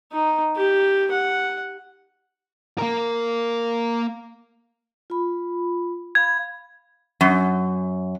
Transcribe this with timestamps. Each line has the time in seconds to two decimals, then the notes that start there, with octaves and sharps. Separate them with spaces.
0.12 D#4
0.56 G4
1.12 F#5
2.78 A#3 A#4
5.10 F4 B5
6.15 F5 B5 G#6
7.21 F#2